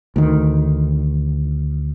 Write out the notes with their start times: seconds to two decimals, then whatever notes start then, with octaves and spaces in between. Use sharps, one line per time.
0.16 D2 D#3